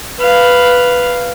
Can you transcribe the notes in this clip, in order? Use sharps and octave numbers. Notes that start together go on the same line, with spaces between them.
B4 F5